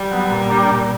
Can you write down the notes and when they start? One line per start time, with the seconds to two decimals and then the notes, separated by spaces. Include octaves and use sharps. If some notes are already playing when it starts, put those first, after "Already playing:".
Already playing: G3
0.11 F#3 B3
0.31 A#2
0.50 A#3 D4 G4
0.71 A#2